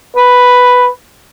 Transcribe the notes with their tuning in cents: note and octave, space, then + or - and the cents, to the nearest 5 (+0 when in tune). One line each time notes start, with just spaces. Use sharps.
B4 +0